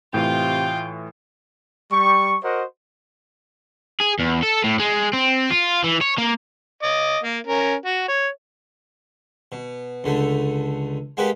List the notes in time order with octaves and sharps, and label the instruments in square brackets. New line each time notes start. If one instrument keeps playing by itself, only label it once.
[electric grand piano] A2 E3 [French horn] C3 [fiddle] F4 F5 [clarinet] G5
[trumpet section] G3 C#6
F#4 A#4 C5 D#5 F#5
[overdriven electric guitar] G#4
E2
A4
A2
G#3
C4
F4
E3
C#5
A#3
[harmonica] D#5 D6
A#3
C#4 A#4
F#4
C#5
[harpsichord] B2
C#2 D3 A3
G#3 A#3 F#4 G4 B4